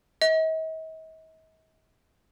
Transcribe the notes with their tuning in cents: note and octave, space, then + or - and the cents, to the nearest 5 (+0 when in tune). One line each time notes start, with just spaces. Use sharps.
D#5 +45